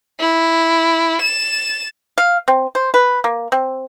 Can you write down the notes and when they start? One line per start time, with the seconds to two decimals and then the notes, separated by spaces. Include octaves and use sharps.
0.20 E4
1.21 A6 E7
2.18 F5
2.48 C4
2.75 C5
2.94 B4
3.24 A#3
3.52 C4